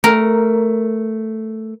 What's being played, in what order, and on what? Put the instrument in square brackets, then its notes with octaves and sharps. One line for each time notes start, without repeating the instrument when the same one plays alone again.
[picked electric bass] A3 [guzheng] A#4